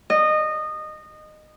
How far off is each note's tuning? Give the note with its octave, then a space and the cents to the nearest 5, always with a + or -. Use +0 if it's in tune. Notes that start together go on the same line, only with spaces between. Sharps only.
D#5 -20